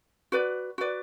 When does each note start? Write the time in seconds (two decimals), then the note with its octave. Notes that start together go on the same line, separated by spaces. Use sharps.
0.32 F#4 B4 D5
0.78 F#4 B4 D5